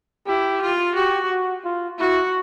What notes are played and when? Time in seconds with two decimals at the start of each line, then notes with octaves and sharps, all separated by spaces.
0.27 E4 G4
0.62 F4
0.96 F#4 G4
1.31 F#4
1.65 F4
1.99 E4 F#4